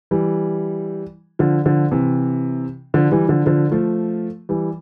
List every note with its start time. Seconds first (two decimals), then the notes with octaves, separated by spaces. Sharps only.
0.11 E3 G3
1.39 D3 F3
1.66 D3 F3
1.91 C3 E3
2.94 D3 F3
3.12 E3 G3
3.28 D3 F3
3.46 D3 F3
3.72 F3 A3
4.49 E3 G3